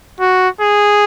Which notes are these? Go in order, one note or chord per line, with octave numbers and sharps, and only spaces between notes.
F#4
G#4